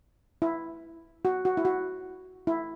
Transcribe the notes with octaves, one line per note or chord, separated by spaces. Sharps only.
E4
F#4
F#4
E4
F#4
E4